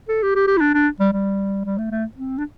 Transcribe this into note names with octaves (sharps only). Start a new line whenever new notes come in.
A4
G4
G4
G4
E4
D4
D4
G3
G3
G3
A3
A3
C4
D4